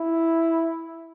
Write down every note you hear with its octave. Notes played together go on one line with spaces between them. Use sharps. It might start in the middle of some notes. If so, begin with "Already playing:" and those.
Already playing: E4